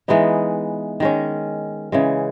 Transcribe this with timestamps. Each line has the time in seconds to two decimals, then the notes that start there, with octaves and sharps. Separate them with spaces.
0.08 E3 G#3 B3 D#4
1.00 D#3 G#3 C#4
1.92 C#3 E3 G#3